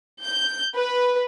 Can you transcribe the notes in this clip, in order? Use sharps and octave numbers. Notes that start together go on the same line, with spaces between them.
G6
B4